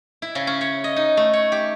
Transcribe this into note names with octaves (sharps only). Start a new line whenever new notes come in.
E4
C#3
C#4
C#5
D#5
D#4
A3
C#5
G4